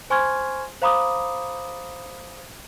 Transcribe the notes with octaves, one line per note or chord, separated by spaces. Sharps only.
C5 G#5 C6 C#6 F6 G#6
C5 F5 A#5 B5 D6 D#6